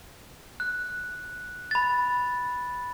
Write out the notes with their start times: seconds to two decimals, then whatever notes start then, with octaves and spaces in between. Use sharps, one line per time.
0.60 F#6
1.71 B5 A6